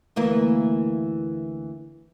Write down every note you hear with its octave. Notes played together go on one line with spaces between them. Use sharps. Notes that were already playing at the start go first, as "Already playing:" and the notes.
D2 E3 A#3